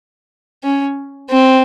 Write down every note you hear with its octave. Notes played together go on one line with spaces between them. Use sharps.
C#4
C4